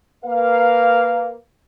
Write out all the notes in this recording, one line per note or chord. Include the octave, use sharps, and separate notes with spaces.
A#3 B4 F5